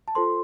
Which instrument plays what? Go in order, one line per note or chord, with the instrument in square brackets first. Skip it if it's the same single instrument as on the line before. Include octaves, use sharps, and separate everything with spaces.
[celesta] A5
F4 A4 C5 C6